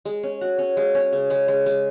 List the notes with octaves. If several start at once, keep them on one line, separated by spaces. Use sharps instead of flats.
G#3
C#4
F#4
C#4
G#3
C#4
C#3
G#3
G#3
G#3